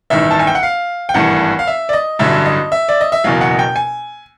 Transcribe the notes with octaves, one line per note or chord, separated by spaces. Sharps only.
A1 G2 D#3 E5
A5
G#5
G5
F#5
F5
G5
G#1 G2 E3 A3 F#5
F5
E5
D5
D#5
A1 G2 D3 F#3 E5
D#5
E5
D5
D#5
E5
F#1 E2 B2 F#3 F5
F#5
G5
G#5